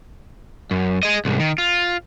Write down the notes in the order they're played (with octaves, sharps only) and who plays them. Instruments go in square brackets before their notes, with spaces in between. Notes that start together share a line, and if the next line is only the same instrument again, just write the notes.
[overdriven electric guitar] F#2
G#4 D#5
C2 G#2
D#3
F4